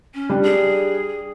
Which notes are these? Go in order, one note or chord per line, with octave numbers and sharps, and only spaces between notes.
C#4
G3 D4
G#4